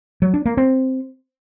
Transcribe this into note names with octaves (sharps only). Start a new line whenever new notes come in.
F#3
D4
A#3
C4